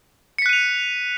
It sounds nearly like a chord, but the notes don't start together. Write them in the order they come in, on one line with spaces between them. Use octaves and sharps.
C#7 B6 F#6 D#7 F7